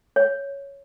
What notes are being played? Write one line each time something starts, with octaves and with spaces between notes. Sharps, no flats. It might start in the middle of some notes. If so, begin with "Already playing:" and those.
C#5